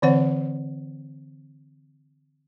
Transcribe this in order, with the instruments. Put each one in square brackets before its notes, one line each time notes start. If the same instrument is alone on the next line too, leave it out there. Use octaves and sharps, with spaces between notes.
[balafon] D3 E3 C4 C5 C#5 F#5